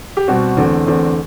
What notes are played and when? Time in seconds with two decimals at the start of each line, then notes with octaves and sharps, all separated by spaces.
0.17 G4
0.28 B2 G3 C4 F#4
0.57 E2 D3 A3 C4
0.87 E2 D3 A3 C4